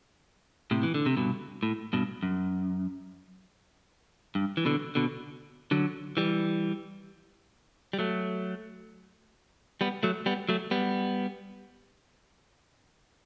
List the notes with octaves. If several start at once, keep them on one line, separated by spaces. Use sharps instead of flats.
A2 C3
E3
D3
C3
G2 B2
A2
G2 B2
F#2
G2
E3
B2 D3
B2 D3
D3 F#3
E3 G3
G3
F#3 A3
G3 B3
F#3 A3
G3 B3
F#3 A3
G3 B3